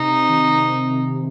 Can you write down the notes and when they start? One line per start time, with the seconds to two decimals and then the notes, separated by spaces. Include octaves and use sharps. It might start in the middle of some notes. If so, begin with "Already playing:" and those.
Already playing: C3 D#4
0.28 D#3